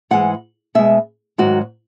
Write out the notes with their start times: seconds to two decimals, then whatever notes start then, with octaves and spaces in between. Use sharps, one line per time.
0.11 G#2 E3 G#3 F#5
0.75 B2 G#3 E5
1.38 G#2 D#3 F#3 F#4